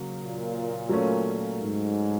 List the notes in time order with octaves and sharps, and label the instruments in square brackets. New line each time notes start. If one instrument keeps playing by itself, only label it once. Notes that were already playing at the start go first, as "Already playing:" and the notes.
Already playing: [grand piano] C#3 F#3 A#3
[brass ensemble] A#2
[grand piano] F#3 A3 C#4
[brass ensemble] G#2